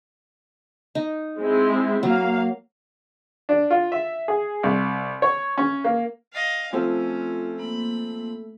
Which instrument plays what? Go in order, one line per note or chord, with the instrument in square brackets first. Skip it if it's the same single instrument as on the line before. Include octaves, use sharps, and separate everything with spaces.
[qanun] D#4
[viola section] G#3 C4 E4
[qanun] F#3 [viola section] A#3 F5
[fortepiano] D4
F4
E5
G#4
C2
C#5
C#4
A#3
[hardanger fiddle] D#5 F5
[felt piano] F3 C4 [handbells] A3 A4 [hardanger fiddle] C#4 [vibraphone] F4
[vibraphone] A#3 [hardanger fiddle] B5